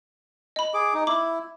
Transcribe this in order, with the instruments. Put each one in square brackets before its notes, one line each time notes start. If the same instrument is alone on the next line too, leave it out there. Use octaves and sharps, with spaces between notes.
[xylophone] D#5 B5
[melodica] G#4 D6
D#4
[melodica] E4 [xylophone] B5 D6